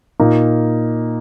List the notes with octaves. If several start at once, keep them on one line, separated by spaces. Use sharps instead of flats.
A#2 A#3 D#4